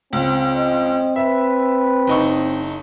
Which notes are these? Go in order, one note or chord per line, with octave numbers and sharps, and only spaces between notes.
C#2 C4
D#5
B4 E5
F#1 D#4 C#6